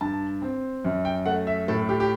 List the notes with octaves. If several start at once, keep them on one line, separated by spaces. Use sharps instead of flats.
G2 A5
C4
F#2
G5
A3 F#5
E5
A2 A4
G4
G4